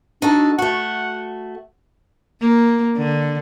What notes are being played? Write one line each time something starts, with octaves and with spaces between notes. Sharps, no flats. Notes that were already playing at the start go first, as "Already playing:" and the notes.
D4 D#4 F#4 A4
A3 F#4 F#5
A#3
D3